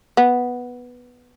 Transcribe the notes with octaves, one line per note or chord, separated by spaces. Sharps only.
B3